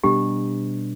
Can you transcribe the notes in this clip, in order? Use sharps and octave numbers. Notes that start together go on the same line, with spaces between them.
B2 G3 B3 D4 G4